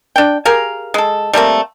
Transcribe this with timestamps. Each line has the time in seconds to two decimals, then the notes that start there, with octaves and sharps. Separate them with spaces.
0.16 D4 G5
0.45 G4 G#4 A#4 F5
0.94 G#3 A4
1.33 G3 A3 A#3 C4